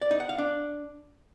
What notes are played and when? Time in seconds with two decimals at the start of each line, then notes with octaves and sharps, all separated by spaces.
0.01 D5
0.11 D#4
0.20 F#5
0.29 F5
0.38 D4